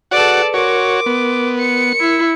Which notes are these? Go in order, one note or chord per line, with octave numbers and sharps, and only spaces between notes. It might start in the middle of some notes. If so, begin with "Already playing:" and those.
F#4 G#4 A4 B4 D5 F#5
F#4 A#4 C#5 C6 D6
B3
C#7
E4